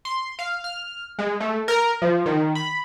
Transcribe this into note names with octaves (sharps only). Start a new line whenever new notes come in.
C6
F5
F6
G#3
A3
A#4
F3
D#3
B5